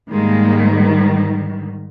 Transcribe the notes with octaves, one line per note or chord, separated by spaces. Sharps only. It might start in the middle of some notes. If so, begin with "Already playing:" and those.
G#2 D#3 G3 G#3 A#3